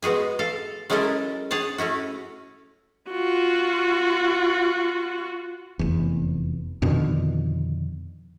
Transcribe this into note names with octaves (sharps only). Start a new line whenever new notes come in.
G#3 B3 F#4 G#4 G#5
A4 F5
F#3 G#3 C#4 E4 A4 A#4
G#4 C#5 F#5 A5
A3 C#4 E4 F#4
F4 F#4
F1 E2
F2 B2 D3 D#3